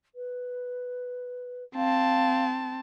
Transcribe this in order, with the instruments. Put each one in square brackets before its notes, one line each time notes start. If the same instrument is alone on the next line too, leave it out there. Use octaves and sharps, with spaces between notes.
[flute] B4
[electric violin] C4 A5 [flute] F5